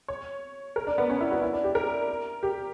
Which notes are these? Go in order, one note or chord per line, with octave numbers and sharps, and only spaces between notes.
C#5
A#4
D4
B3
C#4
E4
F#4
E4
D4
G4
A#4
G4